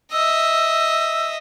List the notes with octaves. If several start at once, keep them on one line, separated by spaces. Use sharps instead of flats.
D#5 E5 E6